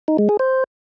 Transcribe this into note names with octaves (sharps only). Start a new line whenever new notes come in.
D#4
G#3
G#4
C5